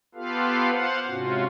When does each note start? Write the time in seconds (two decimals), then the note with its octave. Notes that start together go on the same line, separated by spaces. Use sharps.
0.15 B3 F4 G4 A4 B4 F5
0.71 C5 F5 F#5
1.07 G#2 C3 C#4 F4 F#4